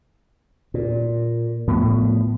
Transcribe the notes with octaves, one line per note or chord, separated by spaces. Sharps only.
A#2
A2 F3 B3